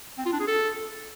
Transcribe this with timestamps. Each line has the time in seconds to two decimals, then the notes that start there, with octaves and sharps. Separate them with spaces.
0.18 C4
0.26 F4
0.33 D4
0.40 G#4
0.47 A4